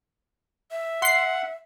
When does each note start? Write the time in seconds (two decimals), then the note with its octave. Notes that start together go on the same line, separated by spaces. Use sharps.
0.71 E5
1.02 F#5 C6 C7